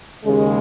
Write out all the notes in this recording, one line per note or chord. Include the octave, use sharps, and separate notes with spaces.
D#2 C#3 G#3